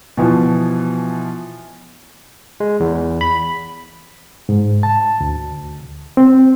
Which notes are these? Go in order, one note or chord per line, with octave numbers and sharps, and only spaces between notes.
B2 E3 F3
G#3
E2
B5
G#2
A5
D2
C4